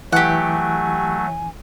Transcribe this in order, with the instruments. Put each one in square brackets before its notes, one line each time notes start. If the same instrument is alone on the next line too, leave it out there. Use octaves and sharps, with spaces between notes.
[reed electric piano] E3 [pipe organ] F#3 A3 [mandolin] G4 F#5 [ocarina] G#5